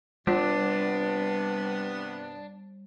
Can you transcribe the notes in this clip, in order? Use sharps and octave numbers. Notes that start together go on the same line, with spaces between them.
G2 C3 G3 B3 D4